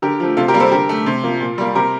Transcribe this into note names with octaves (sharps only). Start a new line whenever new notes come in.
D3 G4 A#4
F3 A3
C3 F4 A4
G4 A#4
G3 A#3
A4 C5
D3 G4 A#4
A3
C3
F3 A#3
A#2
G3 A#3
C3 G4 A#4